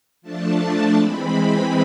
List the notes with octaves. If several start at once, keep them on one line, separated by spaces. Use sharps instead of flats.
F3 A3 D4 A5
E3 G#3 C4 B5